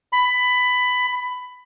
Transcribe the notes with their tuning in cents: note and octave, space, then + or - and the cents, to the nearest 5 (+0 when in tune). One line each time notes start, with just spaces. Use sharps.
B5 +15